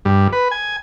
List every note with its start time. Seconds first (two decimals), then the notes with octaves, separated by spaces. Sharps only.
0.05 G2
0.33 B4
0.51 G#5